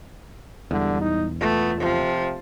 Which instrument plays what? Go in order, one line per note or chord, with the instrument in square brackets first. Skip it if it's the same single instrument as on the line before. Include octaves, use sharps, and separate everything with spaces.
[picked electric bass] E1 E2 [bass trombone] D3 [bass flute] G3
[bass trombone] D#4
[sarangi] A3 [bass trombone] B3 [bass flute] F4
[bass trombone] C3 [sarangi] F3